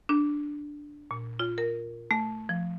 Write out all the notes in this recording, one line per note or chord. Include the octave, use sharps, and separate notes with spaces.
D4
A#2
F4
A#4
A3
F3